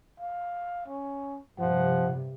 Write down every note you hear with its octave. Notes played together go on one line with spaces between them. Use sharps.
F5
C#4
G2 C3 F3 F#5